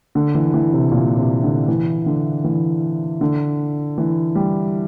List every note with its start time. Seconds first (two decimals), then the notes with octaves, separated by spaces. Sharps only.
0.15 D3
0.35 E3
0.54 E3
0.73 C3
0.92 A#2
1.17 C3
1.43 D3
1.68 E3
2.06 D3
2.44 E3
3.21 D3
3.98 E3
4.35 G3